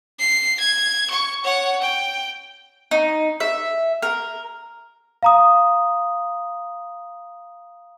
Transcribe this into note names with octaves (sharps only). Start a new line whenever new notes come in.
C7
G#6
C#6
C#5 F#5
G5
D#4
E5
A#4
F5 A#5 D#6